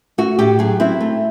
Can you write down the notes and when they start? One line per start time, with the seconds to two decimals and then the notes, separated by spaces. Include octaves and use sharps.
0.18 A3 F#4
0.39 A2 G4
0.59 F#3 G#4
0.80 C4 E4
1.01 A3